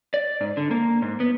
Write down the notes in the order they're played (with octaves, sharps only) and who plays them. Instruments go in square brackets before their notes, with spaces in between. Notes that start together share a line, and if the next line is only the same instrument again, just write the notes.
[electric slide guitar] D5
G#2
D3
A#3
G#2
B3